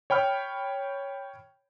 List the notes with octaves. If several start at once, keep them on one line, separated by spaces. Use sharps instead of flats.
C#5 G5 B5 F6